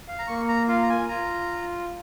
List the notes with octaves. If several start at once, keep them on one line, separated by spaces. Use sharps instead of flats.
F5
A#5
A#3 C#6
A#5
F4 F5
A#5
G#5
F4 A#5